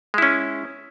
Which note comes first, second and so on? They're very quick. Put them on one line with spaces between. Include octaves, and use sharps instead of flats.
G#3 E4 C#4